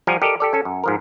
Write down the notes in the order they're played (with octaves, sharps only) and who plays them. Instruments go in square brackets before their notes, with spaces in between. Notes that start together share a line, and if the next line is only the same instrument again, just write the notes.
[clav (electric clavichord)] F3 G3 F#4 G#5 A#5
G4 A4 A#4 D5 D#5
G4 A4 D5
C#4 A4 G#5
F#2
G#2 F3 A#4